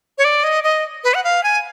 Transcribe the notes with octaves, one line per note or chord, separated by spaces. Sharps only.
C#5
D5
D#5
D#5
B4
F#5
F5
G#5